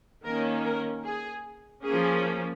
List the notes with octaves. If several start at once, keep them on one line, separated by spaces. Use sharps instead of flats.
D#3 A#3 C#4 A#4
A#4
G#4
F3 A#3 C#4 G#4